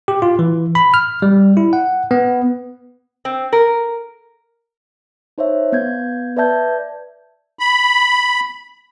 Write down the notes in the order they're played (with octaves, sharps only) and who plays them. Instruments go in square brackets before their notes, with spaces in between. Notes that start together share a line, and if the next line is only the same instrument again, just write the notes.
[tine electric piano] G4
F4
E3
B5
F6
G3
E4
F#5
B3
[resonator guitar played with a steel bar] C4
A#4
[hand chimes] D#4 C5 C#5 E5
B3 G6 G#6
B4 D5 E5 A5 G6 G#6
[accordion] B5